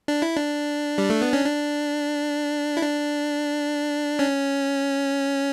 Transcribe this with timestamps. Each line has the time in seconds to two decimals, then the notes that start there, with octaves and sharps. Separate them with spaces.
0.08 D4
0.22 E4
0.37 D4
0.98 G3
1.10 A3
1.22 B3
1.33 C#4
1.45 D4
2.77 E4
2.82 D4
4.19 C#4